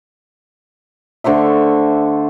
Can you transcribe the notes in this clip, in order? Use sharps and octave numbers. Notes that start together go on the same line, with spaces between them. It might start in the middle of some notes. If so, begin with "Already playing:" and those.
D3 A3 C5 E5